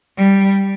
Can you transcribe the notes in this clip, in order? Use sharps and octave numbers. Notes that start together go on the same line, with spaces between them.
G3